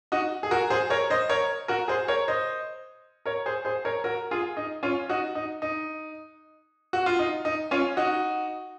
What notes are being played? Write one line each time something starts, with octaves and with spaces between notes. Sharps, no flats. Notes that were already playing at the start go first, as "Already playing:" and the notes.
D#4 F#4
G#4
F#4 A#4
G#4 C5
A#4 C#5
C5 D#5
A#4 C#5
F#4 A#4
G#4 C5
A#4 C#5
C5 D#5
A#4 C#5
G#4 C5
G#4 C5
A#4 C#5
F#4 A#4
F4 G#4
D#4
C#4 F4
D#4 F#4
D#4
D#4
F#4
F4
D#4
D#4
C#4 F4
D#4 F#4